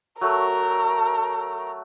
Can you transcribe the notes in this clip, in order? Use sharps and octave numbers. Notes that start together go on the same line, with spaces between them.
F#3 A3 A#4